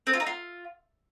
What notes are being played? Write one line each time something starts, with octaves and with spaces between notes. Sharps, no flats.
C4
F4
D#4
F4